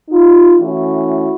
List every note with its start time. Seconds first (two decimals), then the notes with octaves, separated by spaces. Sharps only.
0.10 D#4 F4
0.59 E3 A3 C#4 E4 F#4